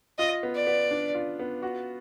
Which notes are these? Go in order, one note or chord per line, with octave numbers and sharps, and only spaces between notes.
F4 D#5
B3
D5
B3
D4
F4
B3
F#4